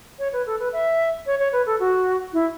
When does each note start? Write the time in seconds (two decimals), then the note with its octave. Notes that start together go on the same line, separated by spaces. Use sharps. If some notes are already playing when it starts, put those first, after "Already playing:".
0.19 C#5
0.33 B4
0.46 A4
0.59 B4
0.73 E5
1.26 C#5
1.39 C#5
1.52 B4
1.66 A4
1.80 F#4
2.33 E4